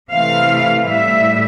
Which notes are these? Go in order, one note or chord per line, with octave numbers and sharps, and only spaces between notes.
C3 E3 A3 F5
A2 G3 E5